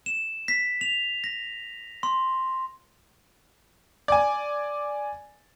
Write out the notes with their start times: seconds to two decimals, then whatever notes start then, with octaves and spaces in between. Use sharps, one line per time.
0.06 E7
0.48 B6
0.81 F7
1.24 A#6
2.03 C6
4.08 D5 G#5